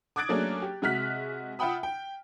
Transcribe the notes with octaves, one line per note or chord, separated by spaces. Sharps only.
D6 D#6 F#6 G#6 A6 D7
F#3 A3 A#3 C#4 D4 G#4
G4
C3 G#3 F#4 F6 F#6 B6
F4 E5 F#5 G5 B5 D#6
G5